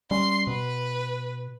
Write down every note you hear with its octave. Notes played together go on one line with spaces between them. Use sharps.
G3 C#4 C6
B2 B4